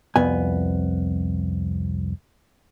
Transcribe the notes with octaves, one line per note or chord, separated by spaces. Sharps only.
C2 F2 B3 G#5